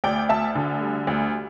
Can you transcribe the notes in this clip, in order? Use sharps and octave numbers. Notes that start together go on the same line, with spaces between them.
D2 D5 G5
D2 E5 A5
D3
G3
D2